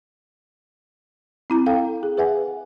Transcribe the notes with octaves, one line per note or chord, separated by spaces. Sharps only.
C4 E4 A#5
A4 F5 G5
G#4
G#4 B4 E5 F#5 G#5